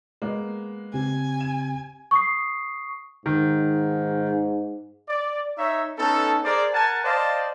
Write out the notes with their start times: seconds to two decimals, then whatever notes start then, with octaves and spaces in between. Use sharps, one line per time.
0.22 G#3 A#3 B3
0.94 C#3 C4 G4 G#5
1.40 E7
2.11 C#6 D#6 C7
3.26 G#2 D#3
5.09 D5
5.58 D#4 C#5 E5
5.99 B3 C#4 D#4 A4
6.44 G#4 A#4 C5 D5
6.73 A#4 F#5 G#5 A5
7.04 C5 D5 D#5 F5 A5